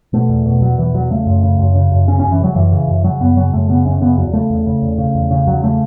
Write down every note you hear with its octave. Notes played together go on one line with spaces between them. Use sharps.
B2 A3
E2
B2
E2 F#3
B2 E3
E2 F#3
C#3 A3
F#2
C#3
F#2
C#3
F#2
C#3 C#4
F#2 C#4
E3
C#3 F#3
F#2 E3
C#3
F#2
C#3 F#3
F#2 B3
C#3 F#3
F#2 A3
C#3 B3
F#2 C#4
C#3 B3
E2 F#3
C#3 A3
E2
C#3
E2
C#3
E2
C#3
E2 F#3
C#3 A3